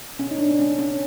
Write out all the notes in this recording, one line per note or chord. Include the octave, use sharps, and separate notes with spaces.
B2 C#4
D#4
D4
G#3 C#4
C#4